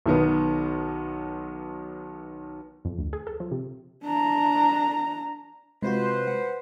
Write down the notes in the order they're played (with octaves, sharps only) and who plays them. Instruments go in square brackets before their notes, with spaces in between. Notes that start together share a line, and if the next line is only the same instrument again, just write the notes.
[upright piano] B1 D#3 B3
[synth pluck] F2
D2
G#4
A4
F3
C3
[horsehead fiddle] D4 A#5
[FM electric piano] C3 F4 F#4 [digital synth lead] G#3 [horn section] B4 C5
[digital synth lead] F#5